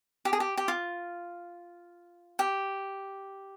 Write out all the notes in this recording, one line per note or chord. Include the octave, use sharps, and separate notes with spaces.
G4
G#4
G4
G4
F4
G4